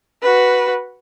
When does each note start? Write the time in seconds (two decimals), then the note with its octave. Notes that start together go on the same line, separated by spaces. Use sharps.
0.22 F#4 B4